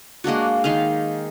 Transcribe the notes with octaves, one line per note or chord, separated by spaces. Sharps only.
G#3 A#3 D4 F#4
D#3 G#4 F5